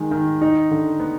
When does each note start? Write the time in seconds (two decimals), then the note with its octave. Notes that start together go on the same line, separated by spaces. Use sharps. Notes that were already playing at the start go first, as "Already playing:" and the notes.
Already playing: D#3 G#3
0.11 D#3
0.41 D#4
0.71 D3
1.00 B3